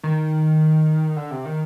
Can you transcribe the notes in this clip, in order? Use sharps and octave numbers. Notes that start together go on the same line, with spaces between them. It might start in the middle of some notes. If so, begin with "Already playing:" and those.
D#3
D3
C3
D#3